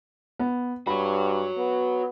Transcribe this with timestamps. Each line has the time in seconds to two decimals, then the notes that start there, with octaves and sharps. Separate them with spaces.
0.39 B3
0.87 G2 F#4 C#5 B5
1.58 B3